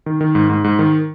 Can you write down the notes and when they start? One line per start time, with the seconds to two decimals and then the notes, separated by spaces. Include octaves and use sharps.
0.06 D#3
0.21 D#3
0.35 G#2
0.50 G#2
0.64 G#2
0.79 D#3